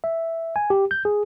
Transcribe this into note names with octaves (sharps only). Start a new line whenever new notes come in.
E5
G#5
G4
G6
G#4